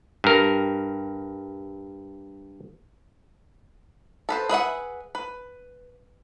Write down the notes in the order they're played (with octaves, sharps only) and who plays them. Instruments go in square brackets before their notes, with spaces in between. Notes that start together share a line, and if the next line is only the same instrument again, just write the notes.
[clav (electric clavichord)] G2 A#4
[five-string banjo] A4 B4 C5
G#4 B4 E5 F#5
B4